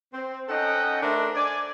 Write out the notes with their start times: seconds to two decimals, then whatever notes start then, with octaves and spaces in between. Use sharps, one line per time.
0.13 C4
0.48 C#4 D#4 A4 D#5 F#5 G5
1.02 A3 D4 A#4 C5
1.34 D5 G#5